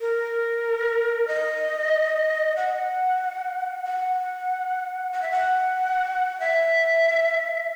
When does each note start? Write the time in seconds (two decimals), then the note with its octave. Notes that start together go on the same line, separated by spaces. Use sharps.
0.01 A#4
1.28 D#5
2.56 F#5
3.84 F#5
5.13 F#5
5.22 E5
5.31 F#5
6.40 E5